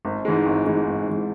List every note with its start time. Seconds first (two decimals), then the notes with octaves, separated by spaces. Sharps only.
0.05 G#1
0.25 G#2 E3 G#3
0.46 G#1
0.66 G#2 E3 G#3
0.87 G#1
1.08 G#2 E3 G#3